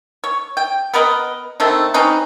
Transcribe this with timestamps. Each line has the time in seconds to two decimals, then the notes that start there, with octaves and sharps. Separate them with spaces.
0.24 C#5
0.57 G5
0.94 B3 A#4 B4 D#5
1.60 D3 D#3 A3 C4
1.94 C4 C#4 D#4 B4